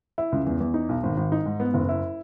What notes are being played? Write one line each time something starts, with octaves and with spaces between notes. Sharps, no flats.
E4
C#2
E2
E2
D#4
B1
G#1
G#1
D#4
G#2
B3
F#1
E4